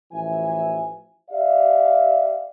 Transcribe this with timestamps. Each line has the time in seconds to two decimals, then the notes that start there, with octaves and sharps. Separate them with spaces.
0.12 A1 E3 F3 E5 G#5
1.31 G4 D5 E5 F5